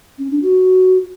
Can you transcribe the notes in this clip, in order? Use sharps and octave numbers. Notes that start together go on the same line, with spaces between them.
C#4
D4
F#4